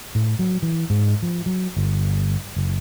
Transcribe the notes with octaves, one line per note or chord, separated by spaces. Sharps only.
A2
F#3
E3
G#2
F3
F#3
G1
F#1